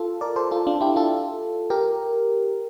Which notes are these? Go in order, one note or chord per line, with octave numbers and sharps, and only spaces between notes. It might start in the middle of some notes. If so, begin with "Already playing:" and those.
Already playing: F4 A4
A#4 D5
A4 C5
F4 A4
D4 F4
E4 G4
F4 A4
G4 A#4